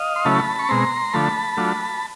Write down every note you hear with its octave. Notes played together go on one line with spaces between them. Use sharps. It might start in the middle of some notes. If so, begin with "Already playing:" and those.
Already playing: D#5 F5
C6
C#3 F#3 A3 C#4 E4 A5 B5
C#6
B2 G#3 C4 A#5 C6
D3 F3 A3 A5 B5
F#3 A3 D4 F4